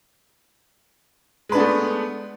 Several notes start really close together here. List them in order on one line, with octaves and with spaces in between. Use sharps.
G#3 B4 D4 B3 A3